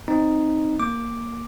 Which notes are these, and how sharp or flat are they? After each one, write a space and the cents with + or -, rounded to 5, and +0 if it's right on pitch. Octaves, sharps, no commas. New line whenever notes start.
C4 +5 D#4 +0
A#3 +0 D6 +0